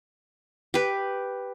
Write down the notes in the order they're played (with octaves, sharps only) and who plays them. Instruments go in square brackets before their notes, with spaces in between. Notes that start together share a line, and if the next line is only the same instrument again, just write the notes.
[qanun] G4 B4